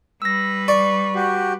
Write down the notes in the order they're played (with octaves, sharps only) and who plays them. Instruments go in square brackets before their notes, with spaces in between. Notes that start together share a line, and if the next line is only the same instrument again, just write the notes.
[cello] G3 B4 [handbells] E6 A#6
[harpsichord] D5 [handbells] C#6
[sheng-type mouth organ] F#4 G4